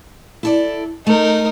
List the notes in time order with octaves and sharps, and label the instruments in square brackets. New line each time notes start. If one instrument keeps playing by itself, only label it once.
[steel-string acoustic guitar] E4 A4 D5
[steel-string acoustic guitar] A3 [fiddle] D#4 A#4